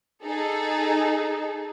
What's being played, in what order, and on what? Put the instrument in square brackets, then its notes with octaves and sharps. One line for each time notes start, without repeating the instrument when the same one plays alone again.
[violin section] D#4 G#4 A4